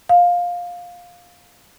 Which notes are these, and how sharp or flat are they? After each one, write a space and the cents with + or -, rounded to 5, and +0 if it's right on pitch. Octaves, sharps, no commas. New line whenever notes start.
F5 +15